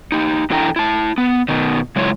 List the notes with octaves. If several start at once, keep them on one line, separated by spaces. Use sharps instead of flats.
D#4 G4
E2 D4 E4 A4 G5 A#5
E4 A5
B3
B2 D#3
C#3 F#3 G#3 E4 F4 C#5